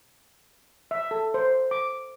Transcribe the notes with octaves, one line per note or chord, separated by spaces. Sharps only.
E5
A4
C5
D6